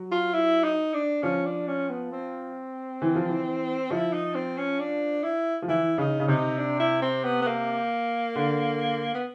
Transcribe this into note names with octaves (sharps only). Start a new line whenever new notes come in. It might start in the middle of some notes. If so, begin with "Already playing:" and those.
Already playing: F#3
F4
E4
D#4
D4
F3 C#4
D4
C#4
B3
C4
E3
F3
E3
F3 E4
D#4
C4
C#4
D4
E4
F3
E3 E4
C#3 D#4
C#3
C3 D#4
D4
E4
C4
B3
B3
A#3
D3
B3